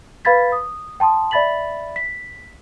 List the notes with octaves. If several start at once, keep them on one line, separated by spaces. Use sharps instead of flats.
B4 F5 B5 G#6 A6 B6
D#6
G5 A5 C6 D#6
D5 E5 B5 A6 B6 F#7
B6